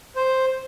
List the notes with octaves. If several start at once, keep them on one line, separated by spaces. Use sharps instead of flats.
C5